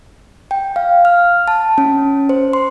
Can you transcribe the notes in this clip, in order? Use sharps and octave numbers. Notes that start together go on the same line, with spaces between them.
G5
F5
F6
A5
C#4
C5
C6